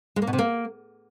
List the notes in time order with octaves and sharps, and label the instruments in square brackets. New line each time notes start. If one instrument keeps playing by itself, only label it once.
[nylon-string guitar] G#3
A#3
B2
C3
A#3